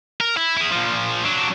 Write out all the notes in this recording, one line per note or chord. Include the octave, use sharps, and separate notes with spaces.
A#4
E4
E4 G#4
A#2 F3
F#3 D4